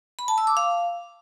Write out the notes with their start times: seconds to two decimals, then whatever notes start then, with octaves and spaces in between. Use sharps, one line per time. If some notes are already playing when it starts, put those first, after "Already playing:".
0.19 B5
0.28 A5
0.38 E6
0.47 D6
0.57 F5